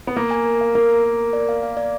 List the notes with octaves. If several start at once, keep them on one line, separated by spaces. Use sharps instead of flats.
B3
A#3 A#4
G#5
A#4
F5
A#3 A#4
A#4
A#4
A#4
D5
F5
F5
D5